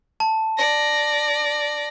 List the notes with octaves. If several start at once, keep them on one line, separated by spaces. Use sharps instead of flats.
A5
D5 A#6